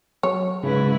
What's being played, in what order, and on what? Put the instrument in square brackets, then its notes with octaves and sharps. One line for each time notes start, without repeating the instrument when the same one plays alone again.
[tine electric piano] F#3 [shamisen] C#5
[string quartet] G#2 E4 B4 [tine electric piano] C#3